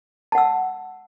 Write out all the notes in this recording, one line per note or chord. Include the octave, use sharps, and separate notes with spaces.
F#5 A5 E6